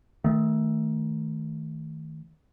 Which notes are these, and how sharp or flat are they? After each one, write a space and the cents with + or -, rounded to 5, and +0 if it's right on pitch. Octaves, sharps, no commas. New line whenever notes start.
D#3 +15 A3 +0